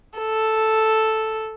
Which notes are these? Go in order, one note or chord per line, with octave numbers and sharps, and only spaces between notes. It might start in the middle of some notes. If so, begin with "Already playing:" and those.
A4